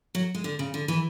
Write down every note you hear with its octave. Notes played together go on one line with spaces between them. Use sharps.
F#3
G#3
D3
C#3
D3
E3